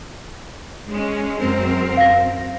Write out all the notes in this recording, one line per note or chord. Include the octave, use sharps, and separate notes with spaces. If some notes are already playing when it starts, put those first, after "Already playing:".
G#3 C#4
F#2 C4 A#4
F5 A#6